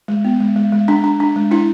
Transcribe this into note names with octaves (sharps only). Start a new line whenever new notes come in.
G#3
B3
G#3
G#3
G#3
D4
D4
D4
G#3
D4 E4